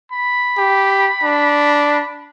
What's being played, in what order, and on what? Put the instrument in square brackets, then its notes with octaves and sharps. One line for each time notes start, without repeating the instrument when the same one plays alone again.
[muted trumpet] B5
[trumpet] G4
D4